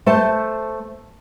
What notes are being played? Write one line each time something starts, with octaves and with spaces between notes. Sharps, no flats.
A3 C5 A5